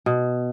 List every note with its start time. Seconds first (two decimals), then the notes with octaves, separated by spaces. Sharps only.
0.06 B2